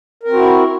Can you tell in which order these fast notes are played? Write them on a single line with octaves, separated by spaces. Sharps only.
A#4 C4 F#4 E4